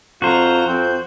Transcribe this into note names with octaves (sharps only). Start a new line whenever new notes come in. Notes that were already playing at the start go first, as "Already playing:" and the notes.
F2 F4 F#4 C5 A#5
F2 C4 G6